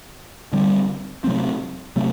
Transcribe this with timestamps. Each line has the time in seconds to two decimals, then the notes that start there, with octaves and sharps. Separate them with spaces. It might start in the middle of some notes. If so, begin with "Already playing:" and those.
0.53 D3 G3 C4
1.24 C3 F#3 A3 C4
1.96 C3 F#3 A3 C4